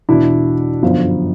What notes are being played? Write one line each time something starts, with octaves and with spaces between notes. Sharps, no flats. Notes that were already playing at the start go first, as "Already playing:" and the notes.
E2 B2 D4 E4
G1 F#2 D3 F3